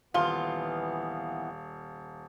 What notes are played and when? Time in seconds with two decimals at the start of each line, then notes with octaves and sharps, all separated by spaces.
0.14 D#1 E3 B3 F4 F5 G7